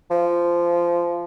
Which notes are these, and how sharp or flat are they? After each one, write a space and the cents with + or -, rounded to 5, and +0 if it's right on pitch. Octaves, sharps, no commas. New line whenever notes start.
F3 -15